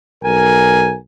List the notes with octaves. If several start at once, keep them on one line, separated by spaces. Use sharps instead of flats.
B1 A#4 G#5